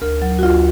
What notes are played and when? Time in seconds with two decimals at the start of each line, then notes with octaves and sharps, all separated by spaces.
0.02 D2 A#4
0.22 F#3
0.39 F#4
0.43 D2 F4